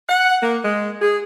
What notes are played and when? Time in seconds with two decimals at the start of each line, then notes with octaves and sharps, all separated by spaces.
0.08 F#5
0.42 A#3
0.64 G#3
1.01 G#4